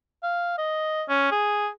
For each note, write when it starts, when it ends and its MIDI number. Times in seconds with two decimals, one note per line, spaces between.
0.23 0.53 77
0.58 1.03 75
1.09 1.31 61
1.31 1.69 68